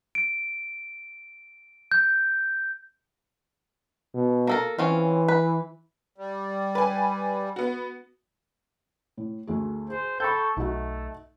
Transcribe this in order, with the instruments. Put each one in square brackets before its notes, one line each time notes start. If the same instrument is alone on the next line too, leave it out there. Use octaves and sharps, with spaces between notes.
[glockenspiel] D7
G6
[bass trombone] B2
[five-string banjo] A#3 A4 A#4
[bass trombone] E3 [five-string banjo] C4 C#4 F4
[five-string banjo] B4
[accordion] G3
[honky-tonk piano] B4 G#5
B3 F#4
[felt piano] A2
D2 A3 G#4
[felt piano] G#4 [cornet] C5
[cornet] A4 [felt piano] G5 B5 [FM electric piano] C#6 G6
[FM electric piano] B1 [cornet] A3 [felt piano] D#4 F#4